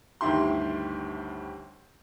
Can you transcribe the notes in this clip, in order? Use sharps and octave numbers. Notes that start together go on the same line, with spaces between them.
G1 D2 D#3 E4 G4 C6